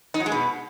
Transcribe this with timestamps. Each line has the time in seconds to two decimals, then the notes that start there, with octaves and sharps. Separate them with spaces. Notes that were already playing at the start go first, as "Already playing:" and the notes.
0.14 D#4
0.20 F#3
0.26 G#3
0.32 B2